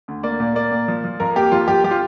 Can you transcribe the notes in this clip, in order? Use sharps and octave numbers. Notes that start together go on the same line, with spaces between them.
D2
A#3 D5
A#2
A#3 D5
A#2
F3
F3
F2 A#4
A#3 G4
F2 F4
F2 G4
F3 G4
F4